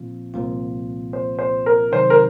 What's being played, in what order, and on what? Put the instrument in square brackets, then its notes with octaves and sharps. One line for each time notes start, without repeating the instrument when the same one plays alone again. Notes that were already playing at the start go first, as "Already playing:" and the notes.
Already playing: [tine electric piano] A#2 F3 C4 F4
C2 A#2 F3 C4 F4
[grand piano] C5
C5
A#4
[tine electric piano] C3 D#3 F#3 C4 D#4 [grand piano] C5
[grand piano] A#4